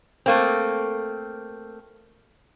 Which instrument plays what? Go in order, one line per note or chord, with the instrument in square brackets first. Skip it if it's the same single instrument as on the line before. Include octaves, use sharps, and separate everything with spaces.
[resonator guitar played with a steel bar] A3 A#3 C4